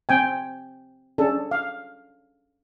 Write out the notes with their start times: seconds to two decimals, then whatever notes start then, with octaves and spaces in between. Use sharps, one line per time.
0.09 C4 G5 G#5
1.18 C#4 D4 G#4 A4
1.51 F5